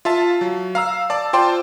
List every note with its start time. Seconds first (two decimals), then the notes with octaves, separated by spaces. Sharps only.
0.05 F4 E5 A5
0.41 F#3
0.75 F5 A#5 E6
1.10 D5 A5 D6
1.33 F4 C5 D5 G5 A5 C6